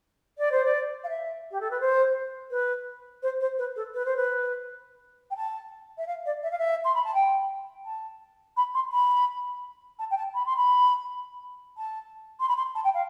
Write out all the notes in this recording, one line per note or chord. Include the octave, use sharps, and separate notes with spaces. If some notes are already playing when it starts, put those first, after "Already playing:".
D5
C5
D5
F5
E5
G4
A4
B4
C5
B4
C5
C5
B4
A4
B4
C5
B4
G5
A5
E5
F5
D5
E5
F5
E5
C6
B5
A5
G5
A5
B5
C6
B5
A5
G5
A5
B5
C6
B5
A5
C6
B5
C6
A5
G5
F5